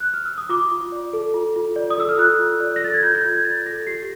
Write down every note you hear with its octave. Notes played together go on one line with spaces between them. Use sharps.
F#6
F6
E6
D#6
F4 D6
F4
D5
A4
F4
F4
D5
D#6
A4 E6
F6
F4 F#6
F4
D5
A#6
A4 A6
G#6
F4 G6
G6
F4 G#6
G#6
D5 A6
A4 A#6
G4 C7